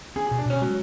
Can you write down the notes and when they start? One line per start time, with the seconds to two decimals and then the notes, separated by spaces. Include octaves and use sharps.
0.16 C#4 G#4
0.27 G#4
0.31 B2
0.38 D4
0.46 B2 C#4
0.61 F#3 G#3